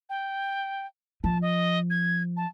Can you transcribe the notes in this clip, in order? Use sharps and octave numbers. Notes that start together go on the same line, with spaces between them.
G5
F3 A5
D#5
G#6
A5